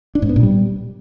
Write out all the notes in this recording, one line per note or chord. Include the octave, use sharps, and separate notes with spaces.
D4
G#2
B3
A#2
G3